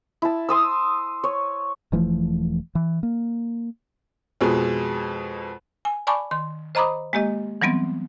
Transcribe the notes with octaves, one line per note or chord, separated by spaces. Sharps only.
E4 A5
C6 D#6 E6
C#5
E1 E3 F3 A3
E3
A#3
F2 B2 G#3
G#5
D5 G#5 A5 B5 C#6 D6
D#3 C6
C5 D#5 A#5 B5 D6 D#6
G#3 A#3 G4 D#5
E3 F#3 G3 B3 C4